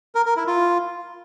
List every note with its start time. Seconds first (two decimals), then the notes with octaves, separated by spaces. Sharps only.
0.15 A#4
0.26 A#4
0.36 E4
0.47 F4